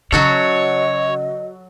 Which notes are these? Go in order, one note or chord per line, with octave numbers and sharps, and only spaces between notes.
C#3 F#3 F#4 A4 C#5 D#5